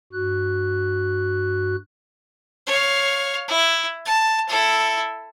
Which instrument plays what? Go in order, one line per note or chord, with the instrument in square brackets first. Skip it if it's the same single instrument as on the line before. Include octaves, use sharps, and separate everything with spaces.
[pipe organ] G2 F#4 F#6
[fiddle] C#5 F5
E4
A5
E4 A4